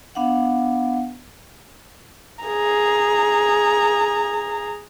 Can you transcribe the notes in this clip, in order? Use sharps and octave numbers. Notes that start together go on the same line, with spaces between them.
B3 D4 F5 F#5
G#4 A#5